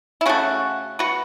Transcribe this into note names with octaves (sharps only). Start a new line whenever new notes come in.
E4
C#3 A3 C#4 F#4
F#4 B4